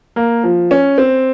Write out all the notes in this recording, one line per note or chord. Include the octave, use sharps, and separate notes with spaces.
A#3
F3
C#4
C4